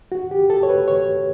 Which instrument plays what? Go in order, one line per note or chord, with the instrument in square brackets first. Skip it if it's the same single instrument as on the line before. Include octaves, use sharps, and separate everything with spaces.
[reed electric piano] F#4
G4
A4
C#5
B4
C#5